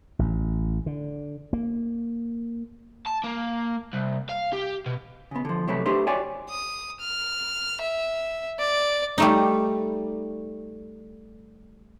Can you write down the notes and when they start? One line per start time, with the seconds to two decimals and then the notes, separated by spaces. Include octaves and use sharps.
0.19 A1
0.86 D3
1.53 A#3
3.07 A5
3.24 A#3
3.94 C2
4.30 F5
4.53 G4
4.86 B2
5.31 C#3 B3
5.45 D3 F3
5.68 C3 F#3 A3 B4
5.86 A3 D4 G4 B4 C5
6.07 F#4 C#5 D5 G5 G#5
6.50 D#6
7.01 F6
7.81 E5
8.59 D5
9.18 G3 A3 D#4